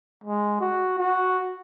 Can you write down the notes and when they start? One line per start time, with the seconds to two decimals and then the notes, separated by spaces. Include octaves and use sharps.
0.24 G#3
0.60 F#4
0.99 F#4